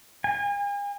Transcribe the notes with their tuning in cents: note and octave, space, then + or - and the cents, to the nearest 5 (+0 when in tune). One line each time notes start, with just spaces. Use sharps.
G#5 -40